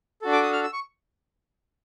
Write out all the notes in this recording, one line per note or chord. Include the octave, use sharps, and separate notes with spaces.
D4 F#4 A4
D6
D#6
F6
E6
C#6